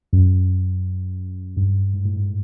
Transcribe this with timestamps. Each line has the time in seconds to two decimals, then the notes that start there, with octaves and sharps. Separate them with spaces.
0.13 F#2
1.57 G2
1.94 G#2
2.05 A2
2.16 G#2